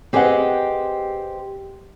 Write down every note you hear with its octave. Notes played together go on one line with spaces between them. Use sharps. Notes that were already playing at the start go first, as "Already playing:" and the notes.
C4 G4 G#4 B4 D#5 F#5